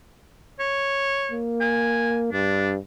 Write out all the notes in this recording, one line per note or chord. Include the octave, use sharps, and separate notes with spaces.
C#5
A#3
G#5
G2 D4